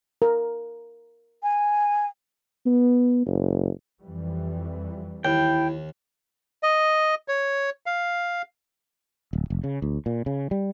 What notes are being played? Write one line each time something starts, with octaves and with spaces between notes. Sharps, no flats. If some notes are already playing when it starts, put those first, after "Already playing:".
A#4
G#5
B3
F#1
F2 E3 G3
D#2 E4 G5
D#5
C#5
F5
D1
F1
C#3
D2
A#2
C#3
G3